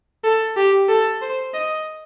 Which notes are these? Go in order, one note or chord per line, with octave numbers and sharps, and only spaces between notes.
A4
G4
A4
C5
D#5